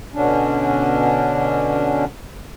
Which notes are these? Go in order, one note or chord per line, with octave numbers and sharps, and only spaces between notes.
B2 D3 C#4 D4